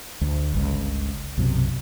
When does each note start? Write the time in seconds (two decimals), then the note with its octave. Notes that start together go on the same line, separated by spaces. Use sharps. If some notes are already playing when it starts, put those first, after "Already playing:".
0.21 D2
0.54 G1 C#2
1.38 B1 F#2 C3